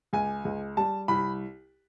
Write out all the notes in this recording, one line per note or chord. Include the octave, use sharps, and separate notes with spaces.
C#2 G#5
C#2
G3 A5
C2 B5